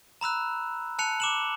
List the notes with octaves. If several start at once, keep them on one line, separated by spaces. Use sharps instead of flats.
A#5 B5 E6 F#6
A5 F#6 C#7 F7
D6 E7 F#7